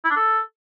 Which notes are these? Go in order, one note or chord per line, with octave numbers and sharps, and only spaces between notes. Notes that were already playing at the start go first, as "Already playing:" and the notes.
E4
D4
A4